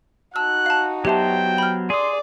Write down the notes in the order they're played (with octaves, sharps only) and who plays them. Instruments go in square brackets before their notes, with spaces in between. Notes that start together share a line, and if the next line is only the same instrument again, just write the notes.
[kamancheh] D#4 F#4 [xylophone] A5 E6 [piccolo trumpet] F#6
[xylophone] F5 A5
[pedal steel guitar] F#3 B3 C5 [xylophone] G4 E5 A5 [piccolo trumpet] G5
[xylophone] B5 F6
[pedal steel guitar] G#4 D#6 [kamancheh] D5 [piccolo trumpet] C6